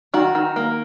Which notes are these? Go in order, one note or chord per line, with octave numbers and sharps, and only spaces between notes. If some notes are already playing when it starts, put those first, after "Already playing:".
D#3 F#4
D#3
A#3